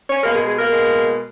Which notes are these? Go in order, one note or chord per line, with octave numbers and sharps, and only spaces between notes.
C#4 C#5
B2 G#3 A#3 A#4
G#3 G#4
G#3 G#4
A#3 A#4
B2 G#3